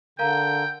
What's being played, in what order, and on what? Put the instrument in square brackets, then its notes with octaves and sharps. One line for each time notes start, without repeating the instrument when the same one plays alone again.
[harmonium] D3 [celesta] A#4 F5 A#5 [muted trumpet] G5